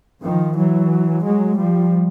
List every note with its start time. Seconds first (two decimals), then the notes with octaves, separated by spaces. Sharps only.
0.23 D#3 F3
0.57 E3 F#3
1.25 F#3 G#3
1.58 F3 G3